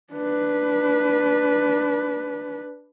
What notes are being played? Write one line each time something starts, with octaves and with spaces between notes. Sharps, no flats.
D4 B4